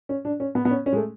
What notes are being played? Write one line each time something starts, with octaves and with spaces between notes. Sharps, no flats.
C#4
D4
C#4
B3
B3
C#4
C#4
G#3
A3